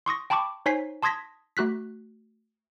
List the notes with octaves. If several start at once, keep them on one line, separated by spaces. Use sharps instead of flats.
C6 C#6 D#6 A#6
G5 A5 B5 C#6 D6
D#4 C5 C#5 G#5 B6 C7
A5 C6 D#6 G#6 A#6 B6
A3 F#4 F#6 B6